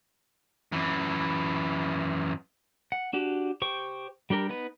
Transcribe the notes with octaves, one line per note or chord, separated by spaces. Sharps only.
F#2 E3
F#5
D4 F#4 G4
G4 C5 G5 C#6
G3 D4 G4 A#4
B3 D#4 B4